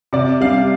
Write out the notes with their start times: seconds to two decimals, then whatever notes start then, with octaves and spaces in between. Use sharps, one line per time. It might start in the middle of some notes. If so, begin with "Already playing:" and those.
0.13 C3 D5
0.41 G3 D4 F5